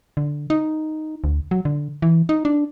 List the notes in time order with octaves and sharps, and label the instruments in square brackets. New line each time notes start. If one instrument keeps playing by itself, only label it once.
[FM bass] D3
D#4
D2
F#3
D3
E3
D#4
D4